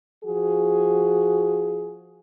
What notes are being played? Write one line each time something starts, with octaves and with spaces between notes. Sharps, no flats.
F3 F#4 G#4